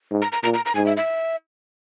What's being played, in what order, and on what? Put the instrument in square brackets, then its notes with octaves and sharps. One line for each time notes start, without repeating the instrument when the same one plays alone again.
[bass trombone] G#2
[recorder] A#5
A#5
[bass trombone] A#2 [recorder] A#5
[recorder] A#5
A#5
[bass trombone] G#2 [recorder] G#5
[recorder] E5
E5